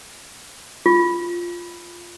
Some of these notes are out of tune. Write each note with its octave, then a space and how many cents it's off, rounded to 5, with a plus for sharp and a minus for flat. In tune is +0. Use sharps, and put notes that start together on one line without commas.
F4 -5